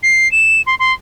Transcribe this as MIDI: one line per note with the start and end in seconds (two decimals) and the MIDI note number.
0.03 0.30 96
0.32 0.62 100
0.67 0.75 84
0.79 0.93 84